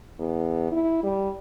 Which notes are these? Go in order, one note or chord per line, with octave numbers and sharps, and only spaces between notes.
E2
E4
G3